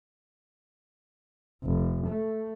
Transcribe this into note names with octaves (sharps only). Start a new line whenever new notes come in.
F1
A3